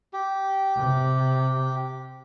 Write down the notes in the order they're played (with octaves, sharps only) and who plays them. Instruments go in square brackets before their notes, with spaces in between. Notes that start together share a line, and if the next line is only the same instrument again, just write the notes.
[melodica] G4
[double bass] C3